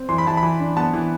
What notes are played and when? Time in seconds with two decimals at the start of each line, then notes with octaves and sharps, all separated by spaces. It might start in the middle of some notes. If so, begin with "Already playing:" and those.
Already playing: C4
0.09 E3 C6
0.18 B5
0.26 E3 A5
0.37 B5
0.43 E3
0.60 D4
0.77 B3 A5
0.93 E3